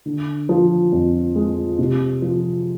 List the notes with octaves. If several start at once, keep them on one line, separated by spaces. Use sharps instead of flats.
D3
F3
F2
G#3
C3
F3